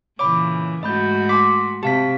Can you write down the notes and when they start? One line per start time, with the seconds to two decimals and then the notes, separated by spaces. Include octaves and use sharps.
0.19 A#2 C#3 E3 C#5 B5 D6
0.83 G#2 A3 F#4 D#5 B5 G6
1.29 G#5 B5 C6 D6 B6
1.83 C3 G4 F5 A5 B6